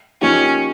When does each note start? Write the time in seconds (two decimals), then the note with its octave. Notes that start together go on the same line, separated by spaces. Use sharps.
0.21 F3 A#3 C#4 D#4 G4